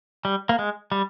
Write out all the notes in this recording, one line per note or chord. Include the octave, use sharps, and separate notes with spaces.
G3
A#3
G#3
G3